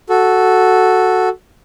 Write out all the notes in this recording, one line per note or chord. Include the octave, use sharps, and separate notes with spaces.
F#4 A4